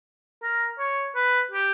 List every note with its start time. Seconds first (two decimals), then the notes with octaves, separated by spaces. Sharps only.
0.43 A#4
0.79 C#5
1.15 B4
1.51 G4